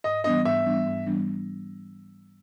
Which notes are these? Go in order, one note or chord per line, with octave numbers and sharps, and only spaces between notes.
G#2 D#5
E3 G3 B3 D4 D#5
G#2 E5
E3 G3 B3 D4
G#2
E3 G3 B3 D4